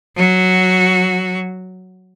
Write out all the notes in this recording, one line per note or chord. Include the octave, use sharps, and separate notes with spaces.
F#3 F#4